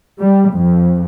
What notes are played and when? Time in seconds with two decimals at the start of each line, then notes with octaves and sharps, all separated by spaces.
0.20 G3
0.53 F2